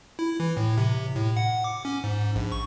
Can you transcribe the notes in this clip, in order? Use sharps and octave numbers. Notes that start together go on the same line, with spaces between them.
E4
E3
A2
C3
A2
F#5
D6
C#4
G#2
A#1
C#6